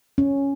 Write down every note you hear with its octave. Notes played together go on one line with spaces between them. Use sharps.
C#4